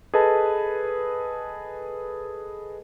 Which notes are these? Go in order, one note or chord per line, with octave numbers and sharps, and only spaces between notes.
G#4 A4 B4 D#5 A5